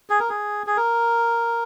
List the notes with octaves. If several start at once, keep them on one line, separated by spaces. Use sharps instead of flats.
G#4
A#4
G#4
G#4
A#4